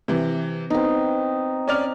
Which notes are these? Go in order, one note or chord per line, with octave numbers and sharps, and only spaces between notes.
C3 E3
B3 C4 D#4
C#4 D5 F6